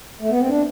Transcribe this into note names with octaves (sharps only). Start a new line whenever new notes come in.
A3
B3
C4
D4